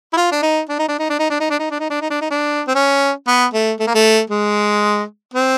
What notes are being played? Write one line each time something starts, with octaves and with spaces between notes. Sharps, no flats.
E4
F4
D4
D#4
D4
D#4
D4
D#4
D4
D#4
D4
D#4
D4
D#4
D4
D#4
D4
D#4
D4
D#4
D4
C4
C#4
B3
A3
A3
A#3
A3
G#3
C4